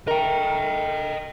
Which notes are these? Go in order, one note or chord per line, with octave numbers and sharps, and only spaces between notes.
A3 A#4 D#5 G5